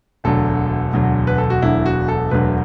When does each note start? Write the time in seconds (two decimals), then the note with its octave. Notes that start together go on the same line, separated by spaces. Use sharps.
0.24 E1 D2 D3 F#3 A4
0.93 E1 D2 D3 F#3
1.27 B4
1.38 A4
1.50 F#4
1.62 E1 D2 D3 F#3 E4
1.86 F#4
2.08 A4
2.31 E1 D2 D3 F#3 B4